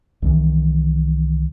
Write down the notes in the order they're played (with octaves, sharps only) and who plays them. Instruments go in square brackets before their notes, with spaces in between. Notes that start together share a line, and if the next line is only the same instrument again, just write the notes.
[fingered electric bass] C2 D#3 E3